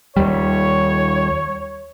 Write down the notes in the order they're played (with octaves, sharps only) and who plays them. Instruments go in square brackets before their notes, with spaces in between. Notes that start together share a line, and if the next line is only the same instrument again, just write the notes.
[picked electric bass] D#2 G3 [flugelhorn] C#5